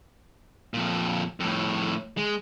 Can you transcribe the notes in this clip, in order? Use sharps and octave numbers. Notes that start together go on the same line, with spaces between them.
F2 A#2
F2 A2
G#3